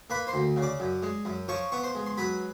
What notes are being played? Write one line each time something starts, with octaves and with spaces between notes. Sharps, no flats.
A#3 B4 B5
C5 C6
D2
C#3
D5 D6
F#2
G#3
F#2
F3 C#5 C#6
B3 C#6
C5 C6
G#3
C6
F#3 B4 B5